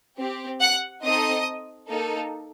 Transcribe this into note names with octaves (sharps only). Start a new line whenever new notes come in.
C4 G4
F#5 F#6
C4 D#4 A4 D#5 D#6
A#3 D#4 A4